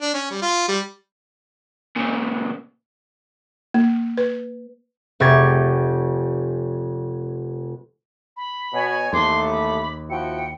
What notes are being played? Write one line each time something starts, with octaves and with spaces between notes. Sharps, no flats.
D4
C#4
G3
F4
G3
A#2 C#3
A#3
B4
F1 G4 C#6 G#6 A6
B5
B2 C#5 G#5
A1 D#2 A3 C6 D6
B5
F3 E4 F#4 G5 C#7